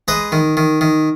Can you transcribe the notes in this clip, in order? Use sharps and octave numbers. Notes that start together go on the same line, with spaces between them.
G#3 B4 D#5
D#3
D#3
D#3